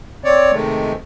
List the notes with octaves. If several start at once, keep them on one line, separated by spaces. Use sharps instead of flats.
C4 C#5 D5
C3 D#3 G#3 A3